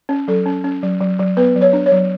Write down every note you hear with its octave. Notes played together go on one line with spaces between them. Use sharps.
C#4
F#3 A4
C#4
C#4
F#3
F#3
F#3
B3 B4
F#3
C#5
D4
C#5
F#3